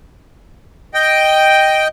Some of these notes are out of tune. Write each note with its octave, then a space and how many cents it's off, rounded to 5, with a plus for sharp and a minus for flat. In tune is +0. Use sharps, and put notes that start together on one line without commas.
D#5 +0 G5 +0